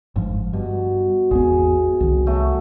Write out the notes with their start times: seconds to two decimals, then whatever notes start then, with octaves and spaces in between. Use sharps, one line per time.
0.16 G1 G#2 F3
0.53 G2 B2
1.31 G#1 E2 B3 G#4
2.00 C2 D#3
2.26 F#3 A3 F#4